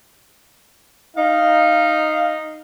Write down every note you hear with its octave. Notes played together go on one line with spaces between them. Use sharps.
D#4 F5